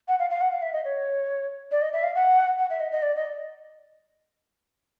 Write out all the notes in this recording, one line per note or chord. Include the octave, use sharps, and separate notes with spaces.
F#5
F5
F5
F#5
F5
E5
D#5
C#5
D5
D#5
E5
F5
F#5
F#5
E5
D#5
D#5
D5
D#5